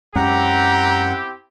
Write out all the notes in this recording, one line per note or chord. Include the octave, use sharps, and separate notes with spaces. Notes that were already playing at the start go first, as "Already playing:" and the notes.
F#2 G#3 C4 C#4 E4 G4 F#5 A#5